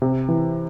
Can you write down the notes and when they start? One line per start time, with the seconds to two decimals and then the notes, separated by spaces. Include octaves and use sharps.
0.02 C3
0.29 E3